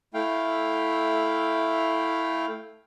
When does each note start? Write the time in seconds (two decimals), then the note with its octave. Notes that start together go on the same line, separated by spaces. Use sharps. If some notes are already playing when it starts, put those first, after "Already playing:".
0.14 A3 E4 F5 G5